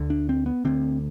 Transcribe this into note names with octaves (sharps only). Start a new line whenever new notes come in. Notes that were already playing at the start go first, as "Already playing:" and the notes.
Already playing: D2 D3
D4
C4
B3
D2 D3 C4